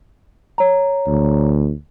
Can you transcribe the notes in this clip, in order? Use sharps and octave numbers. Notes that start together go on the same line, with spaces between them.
C#5 A#5
D2